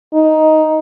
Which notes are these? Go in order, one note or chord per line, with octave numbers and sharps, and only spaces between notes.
D#4